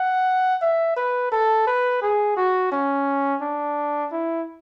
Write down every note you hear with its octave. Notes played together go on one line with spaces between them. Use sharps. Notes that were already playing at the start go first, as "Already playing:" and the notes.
Already playing: F#5
E5
B4
A4
B4
G#4
F#4
C#4
D4
E4